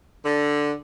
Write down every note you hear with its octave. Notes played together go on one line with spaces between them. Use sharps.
D3